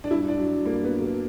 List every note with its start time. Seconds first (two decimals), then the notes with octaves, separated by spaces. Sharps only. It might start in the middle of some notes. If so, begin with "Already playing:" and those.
0.04 D4
0.10 G2 E4
0.28 D4
0.38 F#3
0.65 G2 A#3
0.84 B3
0.93 F#3
1.02 B3